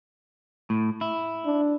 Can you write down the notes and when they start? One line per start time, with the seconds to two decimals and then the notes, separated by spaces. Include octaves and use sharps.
0.70 A2
1.01 E4
1.45 D4